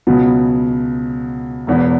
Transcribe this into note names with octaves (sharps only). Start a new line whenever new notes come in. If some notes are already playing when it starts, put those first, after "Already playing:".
C#2 B2 F#3 B3
E1 E2 E3 B3